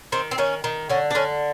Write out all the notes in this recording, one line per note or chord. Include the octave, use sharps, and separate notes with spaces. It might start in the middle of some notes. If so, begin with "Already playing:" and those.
D#3 C4
C4
D#3 C#4
D#3
D3 C#4
D4
D3 C#4